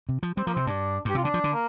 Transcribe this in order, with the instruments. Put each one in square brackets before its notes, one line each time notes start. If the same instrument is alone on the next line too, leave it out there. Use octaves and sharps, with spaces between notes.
[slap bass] C3
F3
[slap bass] G3 [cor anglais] C4
[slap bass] F3 [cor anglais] A#3
[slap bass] C3 [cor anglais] C4
[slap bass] G2 [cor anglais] D4
[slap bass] G2 [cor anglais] G4
[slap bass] C3 [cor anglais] F4
[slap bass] D3 [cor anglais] D4
[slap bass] F3
D3
[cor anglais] A#3